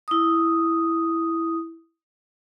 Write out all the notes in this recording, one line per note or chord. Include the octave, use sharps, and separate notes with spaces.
E4 D#6